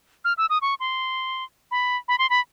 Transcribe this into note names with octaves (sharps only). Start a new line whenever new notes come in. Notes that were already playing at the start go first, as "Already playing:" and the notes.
F6
E6
D#6
C#6
C6
B5
B5
C6
B5